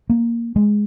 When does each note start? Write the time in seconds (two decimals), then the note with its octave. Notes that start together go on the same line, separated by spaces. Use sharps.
0.10 A#3
0.56 G#3